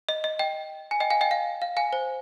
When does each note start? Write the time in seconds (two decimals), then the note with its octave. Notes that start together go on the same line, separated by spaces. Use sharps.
0.09 D#5
0.24 D#5
0.39 D#5 G5
0.91 G#5
1.00 D#5 G5
1.10 F5 G#5
1.21 D#5 G5
1.31 F5
1.62 F5
1.77 F5 G#5
1.93 C5